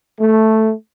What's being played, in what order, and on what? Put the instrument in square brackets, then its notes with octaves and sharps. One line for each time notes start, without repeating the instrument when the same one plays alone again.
[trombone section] A3